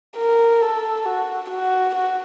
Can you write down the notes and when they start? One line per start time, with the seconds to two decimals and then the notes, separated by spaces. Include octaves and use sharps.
0.17 A#4
0.62 A4
1.05 F#4
1.50 F#4
1.95 F#4